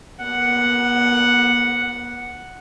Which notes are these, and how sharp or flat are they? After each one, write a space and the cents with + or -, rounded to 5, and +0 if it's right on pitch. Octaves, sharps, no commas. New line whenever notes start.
B3 -45 F#5 +0